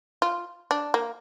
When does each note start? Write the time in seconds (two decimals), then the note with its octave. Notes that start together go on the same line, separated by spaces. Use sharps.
0.22 F4
0.71 D4
0.94 A#3